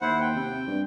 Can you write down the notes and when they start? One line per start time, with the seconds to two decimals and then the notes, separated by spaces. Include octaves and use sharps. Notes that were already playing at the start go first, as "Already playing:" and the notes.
0.01 D#2 E4 C5 F#5
0.21 G5
0.36 C3
0.68 G2